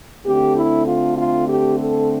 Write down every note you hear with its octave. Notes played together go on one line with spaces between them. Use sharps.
D3 A3 C4 G4
E4
F4
F4
G4
A4